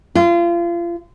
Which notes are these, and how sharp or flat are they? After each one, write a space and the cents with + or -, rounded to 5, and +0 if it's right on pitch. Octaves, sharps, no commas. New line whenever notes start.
F4 -30